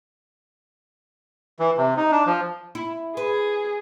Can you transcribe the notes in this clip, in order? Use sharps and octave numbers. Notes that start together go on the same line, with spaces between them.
E3
C3
D#4
D4
F3
E4
G#4 B4